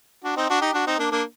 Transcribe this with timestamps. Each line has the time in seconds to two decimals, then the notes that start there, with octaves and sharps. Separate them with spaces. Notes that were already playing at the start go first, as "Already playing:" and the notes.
0.24 D4 F#4
0.36 C4 D#4
0.50 D4 F#4
0.61 D#4 G4
0.73 D4 F#4
0.87 C4 D#4
0.98 A#3 D4
1.11 A#3 D4